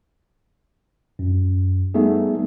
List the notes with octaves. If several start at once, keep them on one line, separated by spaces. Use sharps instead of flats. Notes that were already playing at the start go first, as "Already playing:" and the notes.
F#2
G3 A3 B3 D#4 G#4